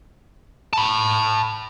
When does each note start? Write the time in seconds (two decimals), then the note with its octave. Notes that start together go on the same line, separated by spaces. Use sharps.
0.73 A5 B5